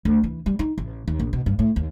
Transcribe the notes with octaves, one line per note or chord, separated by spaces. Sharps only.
D2
E3
G3
D#4
A1
D#2
A#1
B2
G2
A2
D#2